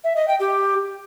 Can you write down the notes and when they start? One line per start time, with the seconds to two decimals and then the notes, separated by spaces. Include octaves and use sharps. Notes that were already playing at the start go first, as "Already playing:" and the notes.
0.04 E5
0.16 D#5
0.28 G5
0.40 G4